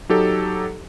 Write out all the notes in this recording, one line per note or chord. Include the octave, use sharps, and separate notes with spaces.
F#3 D#4 G4 A4